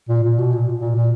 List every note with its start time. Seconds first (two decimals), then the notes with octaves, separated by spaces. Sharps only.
0.09 A#2
0.23 A#2
0.38 B2
0.52 A#2
0.81 A#2
0.96 A#2